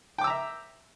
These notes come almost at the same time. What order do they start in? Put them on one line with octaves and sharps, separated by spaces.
G5 D6 E6 A#5 E5